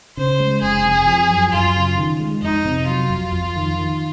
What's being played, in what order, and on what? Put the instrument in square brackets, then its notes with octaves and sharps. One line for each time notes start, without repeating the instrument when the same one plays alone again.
[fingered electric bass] C#3 [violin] C5
[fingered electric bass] G#3
[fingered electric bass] F1 [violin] G#4
[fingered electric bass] F2
F3
F#2
[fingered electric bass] F#2 [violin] F4
[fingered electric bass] C#3
D#3
G#3
[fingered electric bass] F2 [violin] D#4
[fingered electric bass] C3
[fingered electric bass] F#3 [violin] F4
[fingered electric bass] F2
F2
D#3
D#3